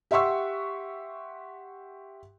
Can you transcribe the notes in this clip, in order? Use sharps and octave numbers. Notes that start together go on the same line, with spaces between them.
G4 E5 F#5 C6 C#6 E6